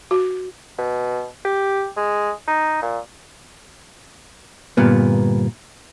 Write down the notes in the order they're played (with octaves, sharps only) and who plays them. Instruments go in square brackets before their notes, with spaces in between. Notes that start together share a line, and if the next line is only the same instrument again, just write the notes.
[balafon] F#4
[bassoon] B2
G4
G#3
D#4
A#2
[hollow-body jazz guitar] D2 G2 A#2 G3 B3